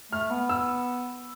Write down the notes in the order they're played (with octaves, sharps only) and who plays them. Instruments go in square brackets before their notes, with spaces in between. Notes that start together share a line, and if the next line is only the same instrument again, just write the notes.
[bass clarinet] A3 [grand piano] F6
[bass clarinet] B3
[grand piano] E6